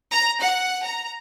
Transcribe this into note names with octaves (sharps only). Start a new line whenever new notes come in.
A#5
F#5
A#5